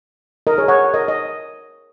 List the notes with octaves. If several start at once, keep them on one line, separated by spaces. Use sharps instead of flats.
A#4 D#5
G#4 C#5
C#5 F#5
A#4 D#5
D#5